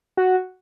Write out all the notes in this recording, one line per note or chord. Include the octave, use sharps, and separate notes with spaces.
F#4